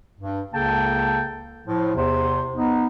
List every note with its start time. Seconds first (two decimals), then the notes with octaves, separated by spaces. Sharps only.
0.21 G2
0.54 C#2 C#3 A#3 A4 G5 A5
1.67 A2 F3
1.95 E2 C3 C5
2.55 B3 D#4